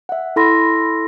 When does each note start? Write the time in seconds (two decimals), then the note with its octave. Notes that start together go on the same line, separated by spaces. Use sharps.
0.09 E5 F#5
0.36 E4 A4 B5 C6 A#6